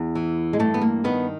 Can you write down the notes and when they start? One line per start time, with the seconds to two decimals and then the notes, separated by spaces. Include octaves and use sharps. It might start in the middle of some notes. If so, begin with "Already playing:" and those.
Already playing: E2
0.15 E3
0.53 G#3
0.59 G2 A3
0.74 B3
0.82 A#3
1.04 D#3 B3